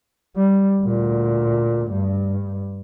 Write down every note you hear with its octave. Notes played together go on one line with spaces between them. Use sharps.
G3
D2 A#2
G2